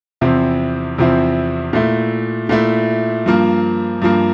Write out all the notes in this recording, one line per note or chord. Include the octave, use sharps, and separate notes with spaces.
E2 C3 F3 C4 E4
E2 C3 F3 C4 E4
A#2 A3 E4
A#2 A3 E4
G2 F3 A#3
G2 F3 A#3